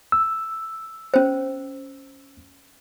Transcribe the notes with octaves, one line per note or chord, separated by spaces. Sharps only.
E6
C#4 C5